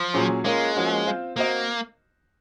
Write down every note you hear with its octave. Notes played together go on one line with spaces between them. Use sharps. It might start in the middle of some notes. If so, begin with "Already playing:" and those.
Already playing: F3
A#2 F#3 C#4 G#4
G#3 A#3 C#4 F4 A#4
F3 A#3 C#4 F#4
C4 F4 C5
A#3 C4 F#4 C5 D#5